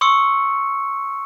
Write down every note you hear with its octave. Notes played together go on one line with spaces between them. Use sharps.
C6 C#6 D#6 E6 C#7